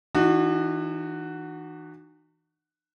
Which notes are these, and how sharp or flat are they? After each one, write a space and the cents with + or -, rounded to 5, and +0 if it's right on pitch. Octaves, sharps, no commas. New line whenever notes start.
E3 -20 D#4 -45 F#4 +0